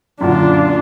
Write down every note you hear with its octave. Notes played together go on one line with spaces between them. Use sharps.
F#2 A#2 D3 D4 F4